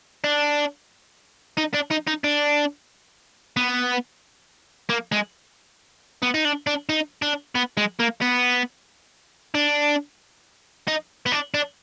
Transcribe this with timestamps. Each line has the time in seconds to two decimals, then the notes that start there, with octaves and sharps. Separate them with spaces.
0.24 D4
1.57 D#4
1.74 D4
1.91 D#4
2.07 D#4
2.24 D4
3.57 B3
4.89 A#3
5.12 G#3
6.22 B3
6.34 D#4
6.45 D4
6.67 D4
6.89 D#4
7.22 D4
7.55 B3
7.77 G#3
7.99 A#3
8.21 B3
9.55 D4
10.88 D#4
11.26 B3
11.32 D4
11.54 D4